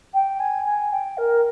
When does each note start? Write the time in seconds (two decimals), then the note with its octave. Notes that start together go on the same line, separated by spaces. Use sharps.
0.14 G5
0.40 G#5
0.65 G#5
0.91 G5
1.17 A#4